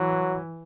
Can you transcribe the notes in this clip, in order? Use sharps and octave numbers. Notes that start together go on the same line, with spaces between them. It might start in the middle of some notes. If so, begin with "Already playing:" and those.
Already playing: E3 F#3